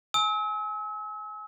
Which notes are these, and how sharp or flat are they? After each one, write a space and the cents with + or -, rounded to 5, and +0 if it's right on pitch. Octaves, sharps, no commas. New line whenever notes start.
G#5 +15 E6 -40